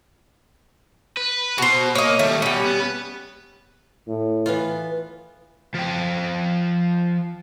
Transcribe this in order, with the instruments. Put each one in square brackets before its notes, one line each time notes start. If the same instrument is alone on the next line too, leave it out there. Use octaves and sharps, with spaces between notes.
[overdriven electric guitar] B4
[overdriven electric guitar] B2 [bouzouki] F#4 C5
[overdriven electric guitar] A#3 [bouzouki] C#5 D#5
[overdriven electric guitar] D#2 G3 [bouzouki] A3
[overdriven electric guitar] B2 [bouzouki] G3 C#4
[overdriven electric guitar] B3
[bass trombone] A2
[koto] E3 B3 F4
[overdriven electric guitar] F3 G5